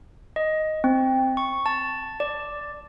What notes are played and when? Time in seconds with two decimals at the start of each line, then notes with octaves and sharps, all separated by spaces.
0.36 D#5
0.84 C4
1.37 C#6
1.66 A5
2.20 D5